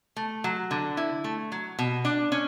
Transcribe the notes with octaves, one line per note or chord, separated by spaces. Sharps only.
A3
F#3
D3
E4
A3
F#3
B2
D4
C#4